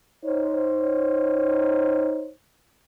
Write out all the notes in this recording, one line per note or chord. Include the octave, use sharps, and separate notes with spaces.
D#4 C5 C#5